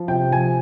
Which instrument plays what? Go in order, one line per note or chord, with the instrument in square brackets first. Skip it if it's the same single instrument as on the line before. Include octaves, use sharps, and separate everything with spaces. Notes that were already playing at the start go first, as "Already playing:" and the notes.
Already playing: [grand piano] F3
C3 G5
F3 G#5